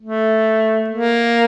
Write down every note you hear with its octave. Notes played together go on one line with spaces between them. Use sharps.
A3
A#3